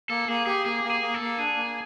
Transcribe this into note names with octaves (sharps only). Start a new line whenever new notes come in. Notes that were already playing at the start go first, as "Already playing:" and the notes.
A#3 A4
A#3 G#4
G4 G#4
A#3 G#4
A#3
G#4
A#3
A4
A#3
D4 G#4
A#3